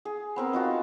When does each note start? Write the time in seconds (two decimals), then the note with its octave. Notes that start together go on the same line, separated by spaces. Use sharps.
0.05 G#4
0.36 B3 C4 A#4
0.53 D#4 F4 F#4